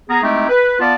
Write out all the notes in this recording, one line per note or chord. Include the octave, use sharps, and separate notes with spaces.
B3 G#4 A#5
G#3 A3 C4 D#4 E4 G4
B4
B3 F4 D5 F5 A5